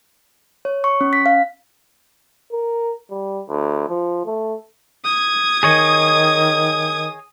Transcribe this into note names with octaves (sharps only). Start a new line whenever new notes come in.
C#5
C#6
C#4
B6
F5
A#4
G3
D2
F3
A3
D#6 G#6
D#3 G#4 C#5 D#5